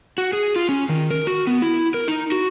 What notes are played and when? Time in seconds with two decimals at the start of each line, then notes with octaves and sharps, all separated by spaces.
0.18 F#4
0.33 G#4
0.56 F4
0.69 C#4
0.89 D#3
1.10 A#4
1.27 F#4
1.47 B3
1.62 E4
1.94 A#4
2.08 D#4
2.32 F#4